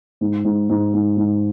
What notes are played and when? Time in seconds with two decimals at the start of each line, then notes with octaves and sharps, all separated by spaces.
0.21 G#2
0.45 G#2
0.69 G#2
0.94 G#2
1.17 G#2